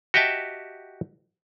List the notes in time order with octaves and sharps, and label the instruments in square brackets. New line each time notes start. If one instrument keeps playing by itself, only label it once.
[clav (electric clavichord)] F#4 G4 D#5 E5 G5 A5